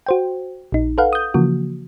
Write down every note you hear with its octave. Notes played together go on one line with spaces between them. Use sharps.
F#4 C5 G5
A#1 D#4
A4 B4 F5 F#5
D#6 G6
C#3 E3 F3 A#3 F#4